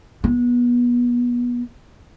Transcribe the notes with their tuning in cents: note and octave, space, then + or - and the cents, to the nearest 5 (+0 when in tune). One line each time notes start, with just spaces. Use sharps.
B3 -25